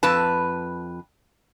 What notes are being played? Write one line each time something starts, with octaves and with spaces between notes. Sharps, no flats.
F2 B4 A5